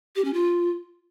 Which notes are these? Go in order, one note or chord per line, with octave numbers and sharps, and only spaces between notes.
G4
C#4
F4